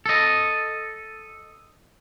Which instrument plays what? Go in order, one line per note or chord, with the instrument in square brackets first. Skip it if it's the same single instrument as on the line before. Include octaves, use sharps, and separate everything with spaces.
[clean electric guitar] A4 D#5